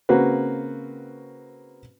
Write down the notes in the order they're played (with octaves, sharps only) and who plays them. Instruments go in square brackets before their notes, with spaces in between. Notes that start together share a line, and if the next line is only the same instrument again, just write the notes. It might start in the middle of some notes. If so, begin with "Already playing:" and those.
[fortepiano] C#3 A#3 C4 F#4 B4